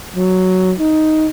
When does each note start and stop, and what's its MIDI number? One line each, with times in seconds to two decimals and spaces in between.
0.16 0.73 54
0.79 1.28 63